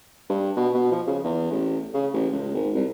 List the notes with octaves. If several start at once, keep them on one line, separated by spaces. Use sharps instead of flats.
G2
B2
B2
F3
C#3
E2
A1
C#3
A1
C#2
G#1
C2